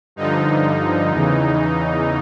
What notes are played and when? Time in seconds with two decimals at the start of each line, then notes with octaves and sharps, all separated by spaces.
0.16 G2 D3 F3 D#4
1.09 E2 C#3 E3